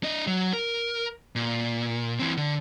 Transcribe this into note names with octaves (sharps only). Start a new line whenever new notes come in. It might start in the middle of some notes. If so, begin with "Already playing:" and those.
D4 D#5
F#3
A#4
A#2
E3 C4
D3